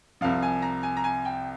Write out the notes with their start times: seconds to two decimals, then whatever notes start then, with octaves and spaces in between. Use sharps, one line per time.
0.21 C2 C3 F3 F5
0.42 G#5
0.62 A#5
0.83 G#5
0.97 A#5
1.04 G#5
1.25 G5